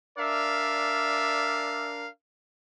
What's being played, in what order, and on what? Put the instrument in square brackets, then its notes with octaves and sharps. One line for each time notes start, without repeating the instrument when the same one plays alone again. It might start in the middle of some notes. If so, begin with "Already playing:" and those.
[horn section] D4 A#4 F5 [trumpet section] D5 E5